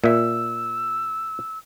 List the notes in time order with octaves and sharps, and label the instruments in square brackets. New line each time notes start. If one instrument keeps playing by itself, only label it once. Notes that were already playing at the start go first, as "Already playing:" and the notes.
[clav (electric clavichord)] A#2 E5 [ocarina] E6